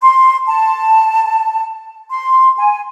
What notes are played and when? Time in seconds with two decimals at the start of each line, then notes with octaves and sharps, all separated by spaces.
0.01 C6
0.48 A5
2.10 C6
2.58 G#5